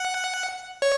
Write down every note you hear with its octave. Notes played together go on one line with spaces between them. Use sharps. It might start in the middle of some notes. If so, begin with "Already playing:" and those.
Already playing: F#5
C#5